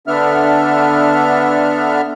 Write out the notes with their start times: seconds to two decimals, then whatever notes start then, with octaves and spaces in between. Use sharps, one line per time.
0.07 D3 B3 D4 A4 E5 F6